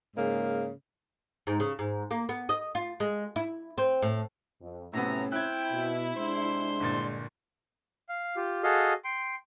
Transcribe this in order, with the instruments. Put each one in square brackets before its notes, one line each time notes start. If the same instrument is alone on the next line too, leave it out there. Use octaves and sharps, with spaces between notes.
[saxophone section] G#2 C#3 A#3
[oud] G#2
C#3
G#2
A#3
B3
D#5
F4
G#3
E4
C4
A2
[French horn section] F2
[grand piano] A2 C3 B3 [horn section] F#3 E5 A#5 [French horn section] A3 C#4
[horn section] C4 E5 G5 [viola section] E4 [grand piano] F#6 G#6
[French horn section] B2
[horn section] C3 C5 C6 [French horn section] G#3 D4
[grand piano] G1 A#2 A6
[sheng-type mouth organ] F5
F4 G4
F#4 G#4 A4 D#5 F5
G5 C6